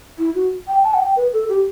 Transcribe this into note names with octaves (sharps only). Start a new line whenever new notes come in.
E4
F#4
G5
A5
F#5
G5
B4
A4
G4